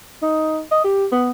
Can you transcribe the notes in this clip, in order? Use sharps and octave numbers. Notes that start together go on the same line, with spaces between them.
D#4
D#5
G4
B3